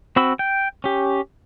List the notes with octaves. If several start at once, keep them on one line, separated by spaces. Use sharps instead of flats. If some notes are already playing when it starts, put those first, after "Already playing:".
C4 F#4 B5 E6
G5
C#4 G4